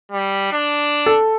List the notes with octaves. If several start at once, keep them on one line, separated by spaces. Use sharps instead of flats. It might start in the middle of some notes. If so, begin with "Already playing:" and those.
G3
D4
A4